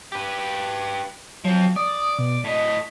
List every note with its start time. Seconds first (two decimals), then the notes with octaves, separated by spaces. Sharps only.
0.12 G4 B4
1.44 F3 F#3 C4
1.76 D5 D#6
2.19 B2
2.44 A2 D#5 B6